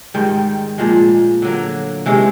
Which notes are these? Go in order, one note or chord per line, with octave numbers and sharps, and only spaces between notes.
G#2 D#3 G3
A#2 F3 G#3
D3 F#3 A#3
C3 E3 G#3 C#4